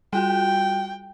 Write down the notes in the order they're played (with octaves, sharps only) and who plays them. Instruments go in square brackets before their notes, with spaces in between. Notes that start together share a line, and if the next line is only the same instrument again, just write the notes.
[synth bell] G3 F4 F#4 [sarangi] G5